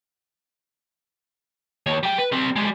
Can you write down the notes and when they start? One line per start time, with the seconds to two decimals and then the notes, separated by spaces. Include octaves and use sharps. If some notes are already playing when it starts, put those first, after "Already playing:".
1.86 D#2 C#5
2.03 G3 G5
2.18 B4
2.32 G3 C4
2.56 G3 G#3